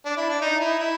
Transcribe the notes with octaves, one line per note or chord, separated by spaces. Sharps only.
D4
E4
D4
D#4
E4
E4